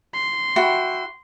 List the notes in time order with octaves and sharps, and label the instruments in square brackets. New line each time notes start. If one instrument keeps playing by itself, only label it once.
[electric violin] C6
[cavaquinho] E4 F#4 G5